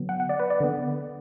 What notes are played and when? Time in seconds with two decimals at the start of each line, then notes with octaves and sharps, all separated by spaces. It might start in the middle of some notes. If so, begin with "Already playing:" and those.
Already playing: D3 F#3 B3
0.09 F#5
0.20 F#5
0.29 D5
0.39 B4
0.50 D5
0.60 D3 B3